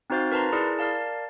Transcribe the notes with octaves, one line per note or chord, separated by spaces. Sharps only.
C4 D#4 F#4 C5 F5 A6
A#4 B4 A5 A#5 C6
E4 G#4 A#4 D5
A#4 D5 F5 A5